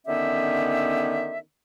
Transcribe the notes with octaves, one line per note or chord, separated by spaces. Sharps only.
D3 D#3 B3 C#4 G4 E5